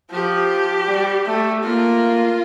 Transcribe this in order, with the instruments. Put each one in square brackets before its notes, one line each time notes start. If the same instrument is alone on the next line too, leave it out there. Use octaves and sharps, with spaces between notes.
[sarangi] F3 [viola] G4
[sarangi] G3
A3
[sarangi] A#3 [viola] F4